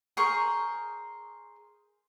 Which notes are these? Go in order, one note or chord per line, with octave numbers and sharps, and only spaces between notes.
G#4 A#4 C5 C#6